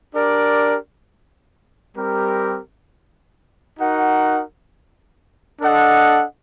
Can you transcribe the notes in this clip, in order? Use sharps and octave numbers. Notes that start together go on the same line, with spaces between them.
D4 G4 A#4 D5
G3 C4 G4 A#4
D#4 F#4 A#4 F#5
D4 A4 D#5 F#5